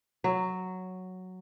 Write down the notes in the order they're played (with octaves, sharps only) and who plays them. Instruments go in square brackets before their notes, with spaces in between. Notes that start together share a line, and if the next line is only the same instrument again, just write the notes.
[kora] F#3